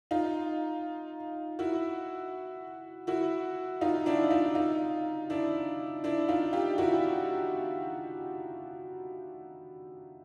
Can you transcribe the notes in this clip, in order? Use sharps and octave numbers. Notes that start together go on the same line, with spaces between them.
D#4 F4
E4 F#4
E4 F#4
D#4 F4
D4 E4
D#4 F4
D#4 F4
D4 E4
D4 E4
D#4 F4
F4 G4
E4 F#4